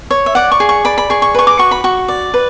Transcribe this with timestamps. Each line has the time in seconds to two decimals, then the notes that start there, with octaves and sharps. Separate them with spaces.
0.11 C#5
0.26 E5
0.35 D5 F#5
0.52 C#6
0.60 G#4
0.69 C#6
0.85 D5 B5
0.98 B5
1.10 G#4 C#6
1.22 C#6
1.35 B4 C#6
1.47 D6
1.59 F#4 C#6
1.71 B5
1.84 F#4 C#6
2.08 D5
2.34 B4